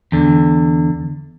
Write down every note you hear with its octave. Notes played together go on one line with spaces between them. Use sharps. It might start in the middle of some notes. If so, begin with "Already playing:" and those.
E2 D3